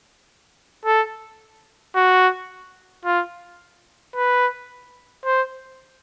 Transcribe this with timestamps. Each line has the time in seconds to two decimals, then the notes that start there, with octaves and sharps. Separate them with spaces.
0.86 A4
1.96 F#4
3.05 F4
4.16 B4
5.26 C5